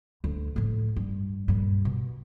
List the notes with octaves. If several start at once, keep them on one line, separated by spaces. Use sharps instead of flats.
D2
A2 F3
G2
G2 A#2
B2